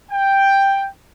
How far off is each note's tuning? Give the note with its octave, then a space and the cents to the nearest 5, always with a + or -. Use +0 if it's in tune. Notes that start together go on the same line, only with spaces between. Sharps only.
G5 +5